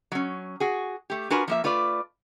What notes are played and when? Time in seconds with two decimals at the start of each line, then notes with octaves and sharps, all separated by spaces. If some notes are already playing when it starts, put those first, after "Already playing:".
0.12 F#3 C#4
0.60 F#4 G#4
1.10 A3 G4
1.30 D4 F4 F#4 A#4 B4 G#5
1.48 F3 A#3 E5
1.64 A3 F4 B4 D5